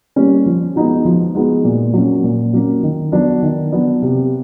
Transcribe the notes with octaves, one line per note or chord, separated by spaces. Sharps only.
G3 A#3 C#4
F3
G#3 B3 D#4 F#4
F3
G#3 B3 D#4 F#4
A#2
F#3 A#3 C#4
A#2
F#3 A#3 C#4
D#3
F#3 B3 D4
D#3
F#3 B3 D4
C3